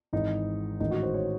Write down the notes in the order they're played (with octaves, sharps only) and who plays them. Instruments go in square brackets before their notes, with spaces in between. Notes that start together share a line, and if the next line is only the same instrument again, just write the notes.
[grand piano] G#1 G#2 E3 D#4
A1 G#2 D#3 D#4
F#4
C5
C#5